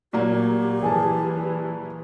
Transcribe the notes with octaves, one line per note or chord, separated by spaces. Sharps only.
A#2 F#3 A#3 G4
E3 G#4 G#5 A5